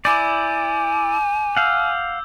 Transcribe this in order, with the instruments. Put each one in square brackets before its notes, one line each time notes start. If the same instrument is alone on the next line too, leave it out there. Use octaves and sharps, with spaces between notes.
[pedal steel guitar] E4 D5 [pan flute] G#5 [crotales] D6 G6
[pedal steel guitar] F5 F#5 [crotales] E6 G6